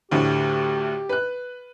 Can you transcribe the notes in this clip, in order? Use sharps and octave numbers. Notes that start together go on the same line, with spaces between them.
D2 A2 D3 G4
B4 F#6